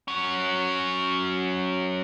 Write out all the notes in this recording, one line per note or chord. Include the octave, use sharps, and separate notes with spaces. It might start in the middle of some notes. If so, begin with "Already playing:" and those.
F#3 C#4